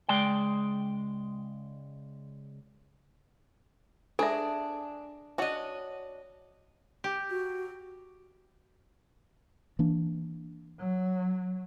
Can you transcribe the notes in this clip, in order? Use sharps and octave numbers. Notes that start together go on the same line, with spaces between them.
C#2 G#3 D5 G5
D4 G#4 A4 E5
D4 F#4 C#5 D#5 F#5
G4
F#4
E3 A#3 D4
F#3